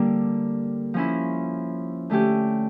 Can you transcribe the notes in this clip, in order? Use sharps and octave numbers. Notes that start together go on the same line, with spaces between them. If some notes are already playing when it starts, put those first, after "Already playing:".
Already playing: D3 G3 A#3 D4
F3 C#4 E4
D3 A3 C#4 G4